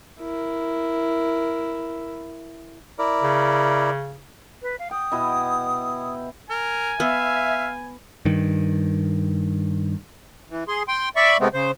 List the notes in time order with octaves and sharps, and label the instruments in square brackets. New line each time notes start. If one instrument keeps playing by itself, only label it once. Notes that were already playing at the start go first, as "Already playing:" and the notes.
[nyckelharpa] E4 A#4
[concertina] E4 A#4 D5
[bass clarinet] C#3
[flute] B4
F5
[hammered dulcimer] G5 [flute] D#6
[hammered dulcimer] B2 E4 D#5
[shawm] A#4 [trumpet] G#5
[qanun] B3 [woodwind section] E5 [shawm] F5
[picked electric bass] G2 D#3
[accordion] E3
G#4 C6
G5 C6
D5 E5 B5 C#6
C3 G#3 A3 B3 C4
C#3 C5